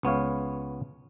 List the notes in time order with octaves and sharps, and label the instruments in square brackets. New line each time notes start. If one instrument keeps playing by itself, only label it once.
[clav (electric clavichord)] C#2 B3 C#5 F5